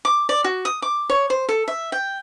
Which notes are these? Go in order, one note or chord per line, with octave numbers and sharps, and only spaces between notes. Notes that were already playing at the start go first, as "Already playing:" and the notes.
D6
D5
F#4
D#6
D6
C#5
C5
A4
E5
G5